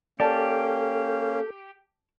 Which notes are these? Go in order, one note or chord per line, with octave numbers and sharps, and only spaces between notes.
A#3 C#4 G4 A4 D5 A5